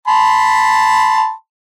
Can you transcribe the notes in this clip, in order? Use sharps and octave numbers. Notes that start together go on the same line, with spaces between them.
A5 B5 C6